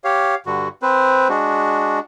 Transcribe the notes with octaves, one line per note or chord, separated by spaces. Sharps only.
G4 C#5 F5
G2 D3 F#4
C4 B4 C5
G#3 D4 F#4